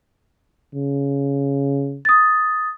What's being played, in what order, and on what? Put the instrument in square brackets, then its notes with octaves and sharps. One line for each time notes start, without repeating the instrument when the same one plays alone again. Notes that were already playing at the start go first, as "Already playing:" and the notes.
[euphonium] C#3
[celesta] D#6 A6